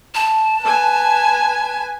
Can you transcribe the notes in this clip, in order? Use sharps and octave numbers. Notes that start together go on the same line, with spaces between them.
A5
B4 G#5